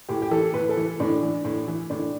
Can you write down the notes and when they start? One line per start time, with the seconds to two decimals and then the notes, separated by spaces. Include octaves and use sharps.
0.09 A2 G4
0.22 G4
0.31 E3 A4
0.54 A2 B4
0.69 A4
0.77 E3
1.00 A2 D4
1.22 E3
1.45 A2
1.68 E3
1.90 A2 D4